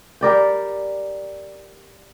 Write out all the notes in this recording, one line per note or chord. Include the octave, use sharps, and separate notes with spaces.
G3 A#4 D5 G5